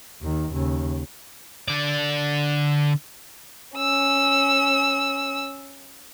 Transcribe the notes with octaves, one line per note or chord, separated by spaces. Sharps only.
D#2 D#3
D#2 C#3
D3 D5
C#4 E6